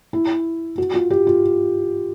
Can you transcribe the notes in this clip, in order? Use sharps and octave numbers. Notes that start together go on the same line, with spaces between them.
E4
F#4
F4
G4
F4